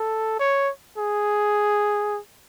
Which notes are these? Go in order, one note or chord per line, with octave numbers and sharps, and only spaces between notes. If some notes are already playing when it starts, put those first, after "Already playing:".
Already playing: A4
C#5
G#4